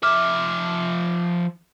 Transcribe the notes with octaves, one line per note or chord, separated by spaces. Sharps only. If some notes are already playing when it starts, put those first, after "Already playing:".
F3 E5 D6 F6